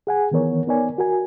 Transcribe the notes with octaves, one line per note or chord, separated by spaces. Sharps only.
G#4 F#5 G#5
D#3 E3 B3 A#4 C#5
B3 D#4 A#4 C#5 D5 G#5
F#4 A#4 G#5